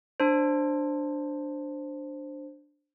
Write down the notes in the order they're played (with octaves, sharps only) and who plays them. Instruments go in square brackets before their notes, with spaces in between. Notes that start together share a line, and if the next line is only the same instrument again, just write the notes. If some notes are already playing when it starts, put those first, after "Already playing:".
[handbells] D4 C5